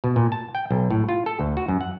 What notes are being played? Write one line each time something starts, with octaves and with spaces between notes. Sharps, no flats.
B2
A#2
A5
G5
B1
A2
F4
A4
D2
F#4
F#2
F#5